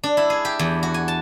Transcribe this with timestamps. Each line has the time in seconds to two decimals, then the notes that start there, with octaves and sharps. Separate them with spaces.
0.03 D4
0.17 E4
0.30 G#4
0.45 G4
0.59 E2
0.83 F#4
0.94 G#5
1.08 A5